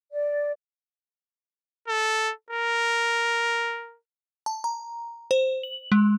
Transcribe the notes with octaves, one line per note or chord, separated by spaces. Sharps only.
D5
A4
A#4
A5
A#5
C5
F#7
G#3